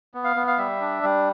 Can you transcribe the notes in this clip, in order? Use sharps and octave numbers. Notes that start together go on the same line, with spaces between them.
B3
F5
B3
F5
G3 E5
D4
G3